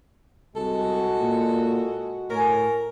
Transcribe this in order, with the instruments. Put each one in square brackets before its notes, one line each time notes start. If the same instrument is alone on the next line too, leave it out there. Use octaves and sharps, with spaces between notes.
[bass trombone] C2 [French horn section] G#3 F#4 [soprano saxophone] A4
[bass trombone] A#2
[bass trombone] A2 [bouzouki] C#4 G#5 [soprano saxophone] A#4